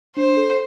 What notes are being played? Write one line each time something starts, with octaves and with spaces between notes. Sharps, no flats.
D4 C5
A4